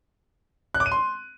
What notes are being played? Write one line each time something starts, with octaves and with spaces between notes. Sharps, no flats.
F#6
D6
D#7
C6